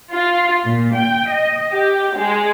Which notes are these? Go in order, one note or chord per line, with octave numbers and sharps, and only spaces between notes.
F4
A#2
G5
D#5
G4
G#3